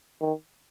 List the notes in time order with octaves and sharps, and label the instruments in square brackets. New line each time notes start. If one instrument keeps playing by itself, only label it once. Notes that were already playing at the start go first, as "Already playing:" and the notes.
[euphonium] D#3